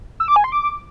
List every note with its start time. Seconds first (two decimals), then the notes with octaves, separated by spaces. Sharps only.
0.20 E6
0.28 D6
0.36 G#5
0.44 C6
0.52 D6